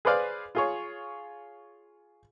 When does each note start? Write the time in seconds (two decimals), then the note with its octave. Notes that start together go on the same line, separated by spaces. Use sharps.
0.05 G#4 B4 C5 D5 F5
0.55 F4 G#4 C#5